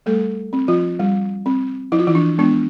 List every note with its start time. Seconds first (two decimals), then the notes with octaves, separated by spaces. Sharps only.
0.06 G3 A3 A4
0.53 C4
0.68 F3 F4
0.99 G3
1.46 C4
1.92 F3 E4
1.99 F4
2.07 E3 E4
2.15 D4
2.38 G#3 B3 D4